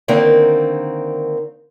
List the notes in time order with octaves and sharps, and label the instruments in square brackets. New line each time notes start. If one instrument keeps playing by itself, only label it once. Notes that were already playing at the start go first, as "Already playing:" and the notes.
[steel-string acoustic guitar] D3 D#3 A#3 C4